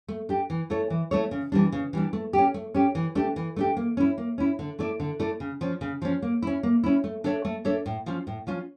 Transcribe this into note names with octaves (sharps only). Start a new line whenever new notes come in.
A3
D4 G4
E3
A3 E4 A4 C#5
E3
A3 E4 A4 C#5
C#3
E3 G3 D4
C#3
E3 G3 D4
A3
C#4 G4
A3
C#4 G4
E3
A3 D4 G4
E3
A3 D4 G4
A#3
C#4 E4
A#3
C#4 E4
D3
A3 E4 A4 D5
D3
A3 E4 A4 D5
C#3
F3 C#4
C#3
F3 C#4
A#3
C#4 E4
A#3
C#4 E4
A3
D4 A4 C#5 E5
A3
D4 A4 C#5 E5
A2
F3 C#4 F4
A2
F3 C#4 F4